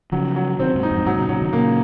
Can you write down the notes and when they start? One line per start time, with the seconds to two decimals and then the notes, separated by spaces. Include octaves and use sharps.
0.12 C#3 F3 F#3
0.36 F#3
0.59 C3 D#3 C4
0.75 G#2 C3
0.83 D#4
0.91 F2 G#2
1.06 G#2 C3 F#3
1.17 A#2 C#3
1.29 A#2 C#3 F#3
1.42 C3 D#3
1.53 A#2 C#3 A#3